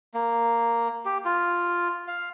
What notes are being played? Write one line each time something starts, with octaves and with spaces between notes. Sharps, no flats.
A#3
G4
F4
F5